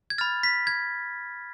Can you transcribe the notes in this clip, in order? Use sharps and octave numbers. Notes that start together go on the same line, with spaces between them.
G#6
B5 F6 A6
B6
G#6